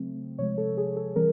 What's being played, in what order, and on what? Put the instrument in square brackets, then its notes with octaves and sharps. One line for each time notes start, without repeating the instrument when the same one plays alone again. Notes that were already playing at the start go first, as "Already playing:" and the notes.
Already playing: [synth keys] C#3 F#3 A3 C4
C3 F3 G#3 C#5
A4
G#4
A4
E3 G3 C4 A#4